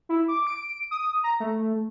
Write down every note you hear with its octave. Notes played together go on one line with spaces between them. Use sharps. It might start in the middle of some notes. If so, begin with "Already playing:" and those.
E4
D6
D7
D#6
A#5
A3